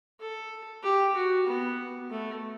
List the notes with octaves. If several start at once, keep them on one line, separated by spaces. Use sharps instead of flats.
A4
G4
F#4
B3
A3